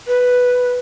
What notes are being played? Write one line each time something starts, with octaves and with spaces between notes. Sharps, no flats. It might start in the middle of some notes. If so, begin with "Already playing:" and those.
B4